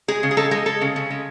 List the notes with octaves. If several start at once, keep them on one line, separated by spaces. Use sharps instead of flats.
G#3 G#4
C#3
G#4
G#3 A4
G#3
G#3 A4
C#3
C#3
G#3